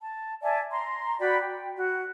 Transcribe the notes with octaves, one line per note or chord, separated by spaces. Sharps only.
A5
D5 E5 G#5 A5
A#5 C6
F#4 D5 G5 B5
G5
F#4